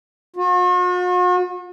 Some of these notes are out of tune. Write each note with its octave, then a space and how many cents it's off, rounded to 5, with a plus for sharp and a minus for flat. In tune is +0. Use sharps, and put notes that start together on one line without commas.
F#4 -45